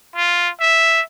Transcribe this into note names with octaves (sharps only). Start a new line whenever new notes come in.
F4
E5